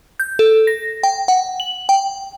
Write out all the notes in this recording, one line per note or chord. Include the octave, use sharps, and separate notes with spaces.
G6
A4
A#6
G5
F#5
F#7
G5